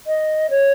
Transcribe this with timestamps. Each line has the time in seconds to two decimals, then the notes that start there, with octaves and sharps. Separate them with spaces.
0.07 D#5
0.50 C#5